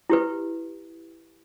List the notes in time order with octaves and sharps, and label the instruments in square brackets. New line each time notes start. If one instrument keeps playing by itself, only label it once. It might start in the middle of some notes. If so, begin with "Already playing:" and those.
[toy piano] E4 G4 B4